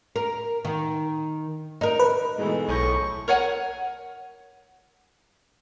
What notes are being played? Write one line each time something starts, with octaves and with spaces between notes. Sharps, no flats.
A#4
D#3
D#4 A#4
B4
G#2 B2 E3 G#3 A3
B1 A2 G#5 C#6 G6 A#6
A#4 C#5 F#5 G#5